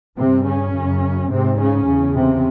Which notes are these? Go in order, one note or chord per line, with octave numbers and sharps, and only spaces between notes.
G2 C3 C4
C#3 C#4
F#2 C#3
G#2 C3 C4
C#3 C#4
E2 C#3
C3 C4